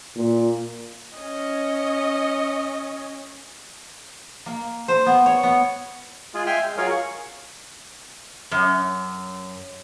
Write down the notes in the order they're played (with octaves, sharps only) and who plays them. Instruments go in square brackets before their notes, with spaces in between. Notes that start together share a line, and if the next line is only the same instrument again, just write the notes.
[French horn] A#2
[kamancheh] C#4 D#5
[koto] A#3
C5
B3
C#5
B3
[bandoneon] G#3 F4 G#4
E5 G5 G#5 C6 F6
G#3
F#3 F4 G#4 A#4 C#5 F5
C#6
[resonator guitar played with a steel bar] F#2